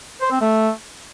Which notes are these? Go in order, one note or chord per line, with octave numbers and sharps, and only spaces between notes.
C5
C4
A3